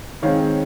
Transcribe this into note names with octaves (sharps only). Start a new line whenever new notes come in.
D#3 G#3 C4 C#5 F5